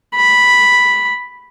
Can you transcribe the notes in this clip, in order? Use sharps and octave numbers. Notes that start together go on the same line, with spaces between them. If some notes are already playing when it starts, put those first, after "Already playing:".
B5